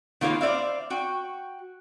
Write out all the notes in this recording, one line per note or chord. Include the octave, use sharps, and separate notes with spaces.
D#3 A#3 F4 B4 F5
C5 D5 E5 F5
F#4 G5